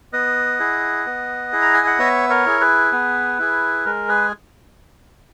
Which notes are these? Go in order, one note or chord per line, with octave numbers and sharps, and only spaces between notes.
B3 D#5 F#5
E4 G#4
B3
E4 G#4
A#5
G#5
F#5
B3 C#5 E5
A#4 C#5
E4 G#4
G#4 B4
B3
E4 G#4
G#3 A#4
G#4 B4